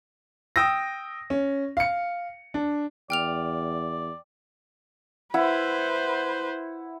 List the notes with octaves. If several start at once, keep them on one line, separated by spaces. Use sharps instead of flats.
G5 D#6 E6 A#6
C#4
F5 C#7
D4
E2 D5 G5 F6 F7
E4 B4 C5 F#5